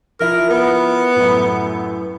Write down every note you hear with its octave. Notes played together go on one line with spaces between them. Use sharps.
F3 E4 A#4
B3
F#2 A2